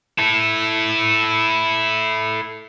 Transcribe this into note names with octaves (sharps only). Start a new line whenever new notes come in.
E4 A4